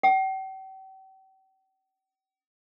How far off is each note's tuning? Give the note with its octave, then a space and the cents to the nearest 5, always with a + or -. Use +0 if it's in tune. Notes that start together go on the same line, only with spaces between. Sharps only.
G5 -45